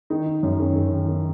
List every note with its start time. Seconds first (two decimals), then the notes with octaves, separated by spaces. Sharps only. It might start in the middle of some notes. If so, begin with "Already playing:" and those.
0.10 D#3 D#4
0.27 D#3
0.43 F#2
0.59 D#3 C#4
0.76 D#3
0.92 D#3
1.08 D#3